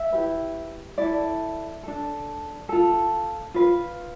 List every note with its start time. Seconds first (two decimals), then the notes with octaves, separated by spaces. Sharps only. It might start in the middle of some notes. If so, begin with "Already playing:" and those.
Already playing: E5
0.12 E4 G4 B4
0.98 E4 A4 D5
1.83 D4 A4
2.69 F4 A4
3.54 F4 B4